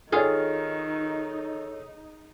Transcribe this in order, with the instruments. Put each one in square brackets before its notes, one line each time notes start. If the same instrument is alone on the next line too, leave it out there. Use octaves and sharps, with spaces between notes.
[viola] D#3 [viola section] D#4 [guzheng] F4 G#4 [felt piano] A4 C#5